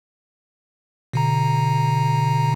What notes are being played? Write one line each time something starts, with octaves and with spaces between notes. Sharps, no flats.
B2 D3 A#5